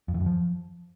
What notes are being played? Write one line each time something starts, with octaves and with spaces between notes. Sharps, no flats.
F2
E2
F#2
F3